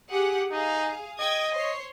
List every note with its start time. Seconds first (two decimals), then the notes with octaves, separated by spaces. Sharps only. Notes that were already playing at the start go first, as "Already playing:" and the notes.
0.11 G4 G#4 F#5
0.51 D#4 G#4 F5
1.20 D#5 G5 D#6 G#6
1.55 C5 C#5 C7